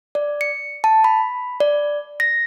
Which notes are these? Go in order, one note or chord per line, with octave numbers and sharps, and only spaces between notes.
D5
C#7
A5
B5
D5
A#6